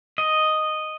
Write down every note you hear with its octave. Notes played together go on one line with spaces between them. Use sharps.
D#5